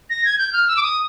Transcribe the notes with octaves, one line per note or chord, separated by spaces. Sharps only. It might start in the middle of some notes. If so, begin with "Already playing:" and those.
A#6
G#6
G6
F6
E6
D6
D#6